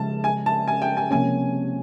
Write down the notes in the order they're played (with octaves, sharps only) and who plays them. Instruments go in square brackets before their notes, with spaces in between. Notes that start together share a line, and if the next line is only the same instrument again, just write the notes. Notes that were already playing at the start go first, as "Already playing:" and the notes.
Already playing: [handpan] C#3 F3 G#3 [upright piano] A5
[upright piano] G#5
A5
G#5
G5
G#5
[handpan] C3 F3 A#3 C#4 [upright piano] G#5